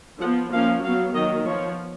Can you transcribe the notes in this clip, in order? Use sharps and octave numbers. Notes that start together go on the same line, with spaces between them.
F3 F#5
B3
F3 A#3 C#4 F5
F#3 B3 F5
D#3 F#3 A#3 D#5
F3 B3 C#5